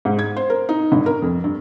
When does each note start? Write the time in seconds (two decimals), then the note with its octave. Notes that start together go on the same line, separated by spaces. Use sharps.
0.05 G#2
0.19 G#6
0.37 C5
0.50 A#4
0.69 D#4
0.92 G1
1.06 A#4
1.22 F2
1.44 G2